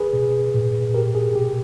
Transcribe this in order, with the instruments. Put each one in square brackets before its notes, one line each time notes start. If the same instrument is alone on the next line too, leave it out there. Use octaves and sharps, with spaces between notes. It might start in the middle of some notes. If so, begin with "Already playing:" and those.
Already playing: [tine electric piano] G#4 B4
B2
A#2
A#2 G4 A#4
G#4
B2 G4